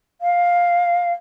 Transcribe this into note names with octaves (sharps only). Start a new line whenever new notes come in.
F5